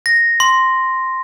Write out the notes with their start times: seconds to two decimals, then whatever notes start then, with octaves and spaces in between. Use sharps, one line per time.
0.06 A#6
0.40 C6